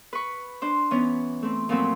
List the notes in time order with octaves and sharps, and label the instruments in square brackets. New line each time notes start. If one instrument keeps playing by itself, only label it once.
[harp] B4 B5 C#6
D4 C5
E3 B3 C#4
A3 C4
A#2 F3 F#3 A3 C4 B5